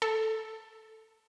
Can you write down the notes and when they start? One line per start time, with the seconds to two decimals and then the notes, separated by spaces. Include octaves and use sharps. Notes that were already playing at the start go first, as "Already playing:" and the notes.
0.02 A4